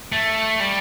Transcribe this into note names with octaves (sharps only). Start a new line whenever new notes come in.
A3
G3